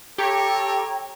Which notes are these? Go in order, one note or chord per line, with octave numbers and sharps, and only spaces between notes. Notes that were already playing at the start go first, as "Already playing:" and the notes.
G4 A4 C#5 G5 A#5